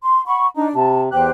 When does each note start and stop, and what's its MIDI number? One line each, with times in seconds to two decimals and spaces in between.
0.02 0.21 84
0.26 0.46 78
0.26 0.46 83
0.26 0.46 85
0.57 0.72 62
0.57 0.68 63
0.75 1.09 48
0.75 1.00 81
1.12 1.30 40
1.12 1.30 67
1.12 1.31 72
1.12 1.31 79
1.12 1.30 90